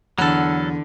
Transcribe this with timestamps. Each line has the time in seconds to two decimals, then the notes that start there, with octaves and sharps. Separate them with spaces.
0.18 E2 D3 F#3 A4 F#5 B5 F6